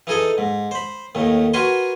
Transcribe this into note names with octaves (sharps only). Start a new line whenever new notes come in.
E3 D#4 G#4 A4 D#5
G#2
C5 B5
D#2 A2 D#3
F#4 A#4 B4 G5 G#5 C6